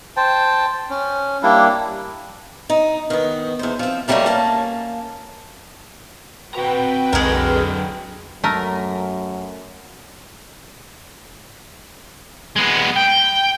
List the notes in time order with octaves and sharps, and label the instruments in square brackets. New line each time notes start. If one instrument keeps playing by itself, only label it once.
[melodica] C5 G5 A5
C#4
G3 A#3 D4 E4
[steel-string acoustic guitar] D#4
D#3 B3
E2 C5
F3 C4
G2 D#3 F#3 G3 A3 A#3
A#3 C#4 A5
[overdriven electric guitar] C4 A#5 [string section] F#4 B4 G5
[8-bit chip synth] B1 F2 [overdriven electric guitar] D3 F#3 [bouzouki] G#3 A#4
[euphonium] F#2 [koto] A3 A#4
[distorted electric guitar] G#3 B3
G5